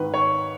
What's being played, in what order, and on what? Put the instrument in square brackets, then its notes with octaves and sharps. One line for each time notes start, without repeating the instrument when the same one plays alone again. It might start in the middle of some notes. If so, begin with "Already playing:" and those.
Already playing: [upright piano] G#1 G#2 D#3 B4
C#5